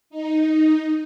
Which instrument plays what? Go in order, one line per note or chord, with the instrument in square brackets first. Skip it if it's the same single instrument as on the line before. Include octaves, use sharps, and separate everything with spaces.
[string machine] D#4